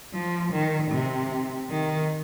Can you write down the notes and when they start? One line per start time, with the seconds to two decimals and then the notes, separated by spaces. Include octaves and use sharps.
0.13 F3
0.52 D#3
0.91 C3
1.70 D#3